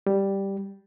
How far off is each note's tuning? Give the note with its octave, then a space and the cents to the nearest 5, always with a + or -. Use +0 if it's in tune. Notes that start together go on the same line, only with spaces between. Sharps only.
G3 +0